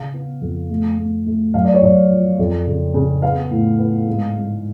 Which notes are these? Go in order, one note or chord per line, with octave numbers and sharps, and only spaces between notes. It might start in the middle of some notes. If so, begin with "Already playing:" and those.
Already playing: C#3 F5
B3
F2
A3
A3
A3
F#2 F5
D5
C#5
F#2 D5
F3
F2
C#3
C#3
B3 F5
A2
B3
G#2
G#2